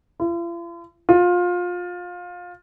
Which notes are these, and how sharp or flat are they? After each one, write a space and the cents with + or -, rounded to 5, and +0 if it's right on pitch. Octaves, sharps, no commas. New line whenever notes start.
F4 -45
F4 +25